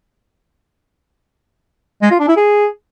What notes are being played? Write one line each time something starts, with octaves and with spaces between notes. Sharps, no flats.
G#3
F4
D4
E4
G#4